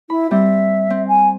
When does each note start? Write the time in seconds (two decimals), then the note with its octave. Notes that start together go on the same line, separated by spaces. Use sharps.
0.10 E4 B5
0.31 G3 C4 E5
0.90 C4
1.08 G#5